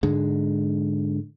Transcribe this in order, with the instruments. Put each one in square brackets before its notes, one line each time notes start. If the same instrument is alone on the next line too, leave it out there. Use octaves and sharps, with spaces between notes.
[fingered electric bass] G#2 D3 G#3